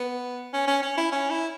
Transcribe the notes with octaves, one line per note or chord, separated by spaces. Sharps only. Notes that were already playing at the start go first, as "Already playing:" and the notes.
Already playing: B3
C#4
C#4
C#4
E4
C#4
E4